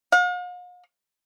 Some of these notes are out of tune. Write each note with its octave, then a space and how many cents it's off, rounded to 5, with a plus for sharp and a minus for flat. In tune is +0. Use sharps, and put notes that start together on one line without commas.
F5 +45